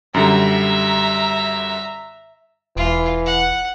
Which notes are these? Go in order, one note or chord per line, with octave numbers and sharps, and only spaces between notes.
F#2 D3 G3 E5 A#5
E1 E3 F4
F#5